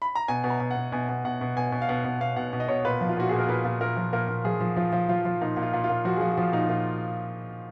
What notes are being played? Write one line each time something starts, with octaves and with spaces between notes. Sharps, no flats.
B5
A#5
B2 G#5
B2
A#5
B2
F#5
B2
B2 G#5
B2
B2 F#5
B2
B2 G#5
B2
F5
B2 F#5
B2
B2 F5
B2 F#5
B2
D#5
B2 C#5
A#2 B4
F3
F4
A#2 F#4
A#2 G#4
A#4
A#2 B4
A#2
A#2 A#4
F3
A#2 A#4
A#2
F3 G#4
F3
F3 F4
F3
F3 F4
F3
A#2 D#4
A#2
F4
A#2
F4
A#2
F3 F#4
G#4
F3 F#4
F#4
F3 F4
A#2 D#4
A#2 F4